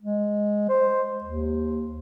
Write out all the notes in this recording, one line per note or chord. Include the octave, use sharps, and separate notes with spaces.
G#3
C5
D#2